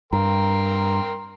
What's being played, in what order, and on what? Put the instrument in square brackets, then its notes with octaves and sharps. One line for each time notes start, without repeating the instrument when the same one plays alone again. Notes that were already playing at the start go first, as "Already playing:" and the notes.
[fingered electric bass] G2 [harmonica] A#4 G5 C6 [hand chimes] A#5